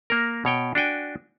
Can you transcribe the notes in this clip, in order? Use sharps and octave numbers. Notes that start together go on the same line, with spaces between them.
A#3 A#4
B2 C#5 G5
D4 F#4 G5 G#5